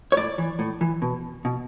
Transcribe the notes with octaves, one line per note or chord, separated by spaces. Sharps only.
C#5
A2 D5
E3
A2
E3
B2
B2